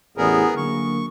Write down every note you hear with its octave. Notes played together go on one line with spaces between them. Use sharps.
A1 E2 B3 G#4 A#4
D3 F#3 A#3 C#6